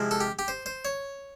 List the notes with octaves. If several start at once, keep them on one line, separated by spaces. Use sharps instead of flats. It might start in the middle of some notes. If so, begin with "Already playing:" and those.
Already playing: C3 F3 G#3 C4 E4
A4
G4
G4
C5
C5
C#5